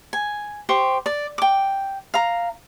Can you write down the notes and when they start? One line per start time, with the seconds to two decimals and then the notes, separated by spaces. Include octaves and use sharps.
0.13 G#5
0.69 G4 C5 C#6
1.06 D5
1.38 G5 D6
2.14 F5 A#5